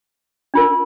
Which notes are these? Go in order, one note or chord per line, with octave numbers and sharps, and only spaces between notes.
D4 F4 A#4